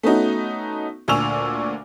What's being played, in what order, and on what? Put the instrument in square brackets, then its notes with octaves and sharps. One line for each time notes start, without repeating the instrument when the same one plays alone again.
[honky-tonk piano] A3 B3 C#4 D#4 F#4
D2 A#2 G#5 C#6 E6 F7